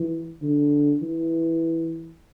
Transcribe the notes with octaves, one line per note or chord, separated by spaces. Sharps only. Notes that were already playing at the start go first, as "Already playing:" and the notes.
Already playing: E3
D3
E3